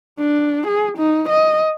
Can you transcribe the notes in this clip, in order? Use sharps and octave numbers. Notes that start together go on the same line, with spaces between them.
D4
G#4
D#4
D#5